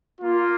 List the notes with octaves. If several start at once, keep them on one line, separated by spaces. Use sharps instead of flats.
A#3 F4